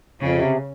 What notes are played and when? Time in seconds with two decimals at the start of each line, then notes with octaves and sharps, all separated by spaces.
0.21 F2 C#3
0.37 C3